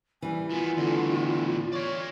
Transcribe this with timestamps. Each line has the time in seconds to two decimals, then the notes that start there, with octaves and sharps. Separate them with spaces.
0.22 E3 G3 G#5
0.50 D#3 B3 F4
0.77 E2 A2 D3
1.73 C#5 D5 F5